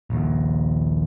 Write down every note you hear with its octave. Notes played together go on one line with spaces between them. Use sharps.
A#1 D#2